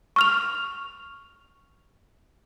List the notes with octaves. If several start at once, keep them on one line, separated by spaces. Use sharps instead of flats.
C#6 F6 F7